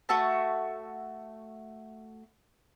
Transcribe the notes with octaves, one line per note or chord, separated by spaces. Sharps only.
A3 F#4 E5 A5